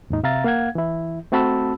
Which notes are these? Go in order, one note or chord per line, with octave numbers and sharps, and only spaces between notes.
D#2 G#2 D#4
C3 E5 F5 A#5 A6
A#3 F5 F#5 G#6
E3 E4
A3 C4 F#4 A5 B5 E6